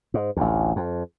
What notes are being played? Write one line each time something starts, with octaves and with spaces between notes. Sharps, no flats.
G#2
A1 D2
F2